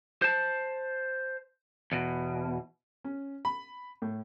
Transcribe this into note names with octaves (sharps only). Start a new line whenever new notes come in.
C5 A5
E2 B2
C#4
B5
A2